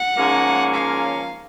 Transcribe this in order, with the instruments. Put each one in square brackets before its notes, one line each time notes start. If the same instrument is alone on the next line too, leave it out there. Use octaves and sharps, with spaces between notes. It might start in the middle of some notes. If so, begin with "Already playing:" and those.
Already playing: [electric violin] F#5
[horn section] G#2 F3 A#3 C#4
[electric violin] F5